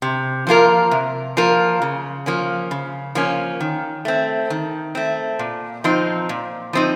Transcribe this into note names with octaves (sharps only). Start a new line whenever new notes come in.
C3
F3 A#3 F4 A#4
C3
F3 A#3 F4 A#4
C#3
F3 A#3 C#4
C#3
F3 A#3 C#4
D#3
A3 C4
D#3
A3 C4
A#2
F3 C4 D#4
A#2
F3 C4 D#4